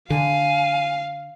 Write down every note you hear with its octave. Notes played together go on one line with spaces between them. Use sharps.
D3 F5 G#5